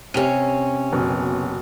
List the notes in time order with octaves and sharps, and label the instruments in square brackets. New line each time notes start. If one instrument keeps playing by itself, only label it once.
[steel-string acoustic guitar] C3 C#4 [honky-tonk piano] D#7 F7
[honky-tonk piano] F#1 B2